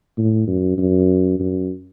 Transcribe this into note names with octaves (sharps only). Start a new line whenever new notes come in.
A2
F#2
F#2
F#2